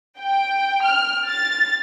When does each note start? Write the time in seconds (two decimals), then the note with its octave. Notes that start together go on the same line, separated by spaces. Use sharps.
0.20 G5
0.85 F6
1.28 A6